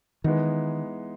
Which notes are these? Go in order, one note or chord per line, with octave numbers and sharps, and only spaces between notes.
D#3 E3 G#3 B3 D#4